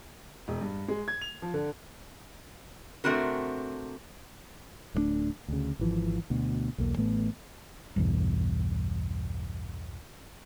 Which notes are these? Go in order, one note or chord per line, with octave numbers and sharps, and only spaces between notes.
E1
G2
G#3
G#6
F7
F3
D3
C3 A3 C4 D4 F#4 A#4
D1 G2 A3 D4
D2 C#3
G#1 E3 F3
D2 B2
B1 E2 A#3
A1 A2 A3 B3
B1 E2 G2